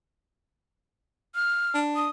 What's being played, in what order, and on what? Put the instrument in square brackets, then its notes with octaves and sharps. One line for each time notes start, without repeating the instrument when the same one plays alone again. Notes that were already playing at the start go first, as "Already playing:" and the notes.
[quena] F6
[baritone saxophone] D4
[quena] D#6